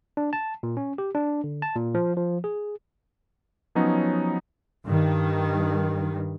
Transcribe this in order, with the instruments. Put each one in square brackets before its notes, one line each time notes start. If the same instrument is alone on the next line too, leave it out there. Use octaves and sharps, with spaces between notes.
[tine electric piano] D4
A5
A#2
C#4
G4
D4
D3
A5
A#2
F3
F3
G#4
[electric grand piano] F3 F#3 B3 C#4 D#4
[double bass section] G2 D#3